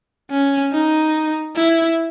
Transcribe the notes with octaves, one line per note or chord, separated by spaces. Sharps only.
C#4
D#4
E4